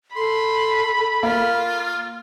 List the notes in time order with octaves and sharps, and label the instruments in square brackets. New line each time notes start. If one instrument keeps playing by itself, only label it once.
[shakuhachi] A4 [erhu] B5 [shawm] C6
[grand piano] A#3 [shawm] F4